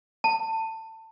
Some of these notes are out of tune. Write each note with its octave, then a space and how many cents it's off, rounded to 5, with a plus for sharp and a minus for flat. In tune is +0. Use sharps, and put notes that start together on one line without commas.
A5 +25